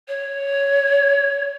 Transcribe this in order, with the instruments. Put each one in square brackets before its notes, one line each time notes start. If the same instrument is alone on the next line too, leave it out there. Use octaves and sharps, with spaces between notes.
[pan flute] C#5